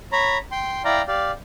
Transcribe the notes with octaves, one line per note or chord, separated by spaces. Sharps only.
C#5 A#5 B5
G5 C6
E4 D5 F5 G5 A#5
G4 D5 F5